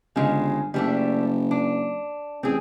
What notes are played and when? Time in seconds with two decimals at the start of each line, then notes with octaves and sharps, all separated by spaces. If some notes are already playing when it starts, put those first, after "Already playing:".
0.16 G1 C#3 G#3
0.74 F#1 G3 A3 D4
1.51 D4
2.43 A1 C4 G#4